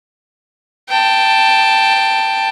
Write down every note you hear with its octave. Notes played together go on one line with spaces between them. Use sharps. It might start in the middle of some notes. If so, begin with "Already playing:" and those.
G5 A5